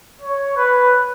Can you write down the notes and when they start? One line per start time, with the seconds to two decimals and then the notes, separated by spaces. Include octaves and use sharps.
0.21 C#5
0.57 B4